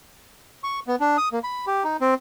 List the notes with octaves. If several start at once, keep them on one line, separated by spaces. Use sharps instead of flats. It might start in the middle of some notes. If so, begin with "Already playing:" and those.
C#6
B3
D4
D#6
A#3
B5
G4
D#4
C4